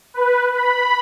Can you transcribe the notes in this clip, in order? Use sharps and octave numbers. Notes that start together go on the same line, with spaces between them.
B4
B5